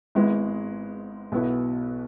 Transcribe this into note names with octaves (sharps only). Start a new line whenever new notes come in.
G#1 G#2 G#3 B3 E4
B1 B2 B3 E4